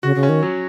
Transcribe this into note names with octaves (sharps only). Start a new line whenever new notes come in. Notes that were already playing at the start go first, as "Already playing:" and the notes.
C#3 F#4
C#3
C#4
D#3
F#3